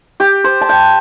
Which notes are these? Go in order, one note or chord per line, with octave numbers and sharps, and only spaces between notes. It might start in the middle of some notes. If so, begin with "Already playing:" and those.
G4
C5
A5
G5